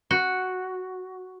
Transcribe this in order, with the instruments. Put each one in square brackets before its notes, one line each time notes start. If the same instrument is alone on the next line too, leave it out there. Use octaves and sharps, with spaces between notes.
[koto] F#4